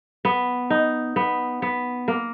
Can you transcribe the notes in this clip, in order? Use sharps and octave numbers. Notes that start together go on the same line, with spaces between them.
B3
D#4
B3
B3
A#3